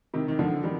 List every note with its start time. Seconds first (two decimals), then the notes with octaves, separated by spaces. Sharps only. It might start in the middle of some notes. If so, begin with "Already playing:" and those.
0.14 C3 D#3
0.28 D#3
0.39 D3 F3
0.63 D#3 G3